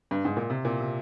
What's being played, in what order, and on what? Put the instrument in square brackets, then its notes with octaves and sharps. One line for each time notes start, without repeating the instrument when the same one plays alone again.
[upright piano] G2
G#2
A#2
C3
A#2
C3